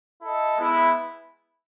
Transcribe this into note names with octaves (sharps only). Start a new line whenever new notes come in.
E4 A4 D#5
G#3 B3 E4